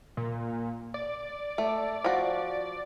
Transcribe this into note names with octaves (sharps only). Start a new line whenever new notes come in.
A#2
D5
A3
F3 F#4